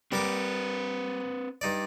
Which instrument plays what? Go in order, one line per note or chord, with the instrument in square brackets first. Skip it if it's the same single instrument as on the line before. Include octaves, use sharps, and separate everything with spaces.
[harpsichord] G3 A#4 D6 [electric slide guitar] C4 B4
[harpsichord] G2 D#4 D5